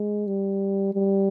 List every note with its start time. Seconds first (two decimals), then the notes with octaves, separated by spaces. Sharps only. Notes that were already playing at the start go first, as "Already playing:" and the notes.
Already playing: G#3
0.27 G3
0.95 G3